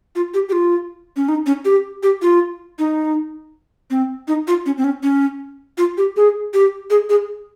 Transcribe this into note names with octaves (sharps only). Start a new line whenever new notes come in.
F4
G4
G4
F4
C#4
D#4
C#4
G4
G4
F4
D#4
C4
D#4
F4
C#4
C4
C#4
C#4
F4
G4
G#4
G4
G#4
G#4